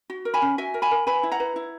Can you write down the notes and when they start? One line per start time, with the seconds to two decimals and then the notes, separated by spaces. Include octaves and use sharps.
0.10 F#4
0.25 A#4
0.34 G#5 B5
0.42 C#4
0.58 F#4 E5 G#5
0.74 A#4
0.82 G#5 B5
0.91 A#4
1.07 B4 G#5 B5
1.23 E4
1.32 F#5 A#5
1.40 B4
1.56 E4